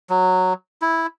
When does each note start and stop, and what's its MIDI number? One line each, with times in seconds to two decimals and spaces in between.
0.10 0.53 54
0.82 1.07 64